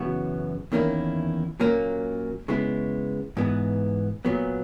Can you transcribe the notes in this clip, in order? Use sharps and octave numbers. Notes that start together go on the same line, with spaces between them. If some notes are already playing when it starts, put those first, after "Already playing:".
Already playing: F#2 C#3 E3 B3 F#4
E2 D#3 A#3 C#4 E4
A#2 F#3 A#3 C#4
C#3 G#3 B3 E4
G#2 E3 B3
A#2 F#3 B3